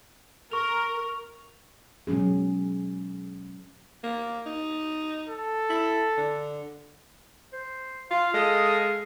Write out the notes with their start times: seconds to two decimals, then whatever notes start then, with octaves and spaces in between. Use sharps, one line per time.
0.52 A#4 C#6 F7
2.07 B2 F#3 G#3 C#4 G#4
4.04 A#3
4.46 D#4
5.28 A4
5.70 E4
6.17 D3
7.53 C5
8.11 F4 F5
8.34 G#3 A4 D#5 D#6